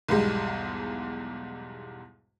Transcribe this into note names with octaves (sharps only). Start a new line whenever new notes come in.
B1 E2 G#2 G3 G#3